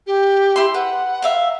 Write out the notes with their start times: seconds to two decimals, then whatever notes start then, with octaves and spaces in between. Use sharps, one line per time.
0.07 G4
0.56 E4 C6
0.74 B4 F#5
1.22 E5 F5 A#5